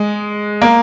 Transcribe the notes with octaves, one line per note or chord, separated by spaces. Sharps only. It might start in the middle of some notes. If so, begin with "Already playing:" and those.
Already playing: G#3
A#3